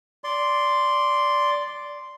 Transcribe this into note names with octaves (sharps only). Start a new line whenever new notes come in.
D5 C6